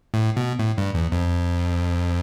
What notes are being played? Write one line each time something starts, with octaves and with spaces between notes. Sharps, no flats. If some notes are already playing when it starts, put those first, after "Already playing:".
A2
B2
A2
G2
E2
F2